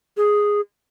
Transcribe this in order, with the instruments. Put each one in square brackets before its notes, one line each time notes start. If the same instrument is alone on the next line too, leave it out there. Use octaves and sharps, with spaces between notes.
[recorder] G#4